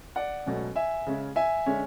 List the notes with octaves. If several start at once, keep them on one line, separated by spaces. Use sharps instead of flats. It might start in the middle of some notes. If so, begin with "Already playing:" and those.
D5 F#5
C#2 B2 F#3 A3 C#4
E5 G#5
C#3 G#3 C#4
E5 G#5
D3 G#3 C#4